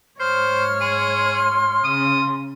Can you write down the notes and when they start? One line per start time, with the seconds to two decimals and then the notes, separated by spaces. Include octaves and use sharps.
0.20 G#2 C5 C#5 F6
0.81 G#4 C6
1.84 C#3 D#6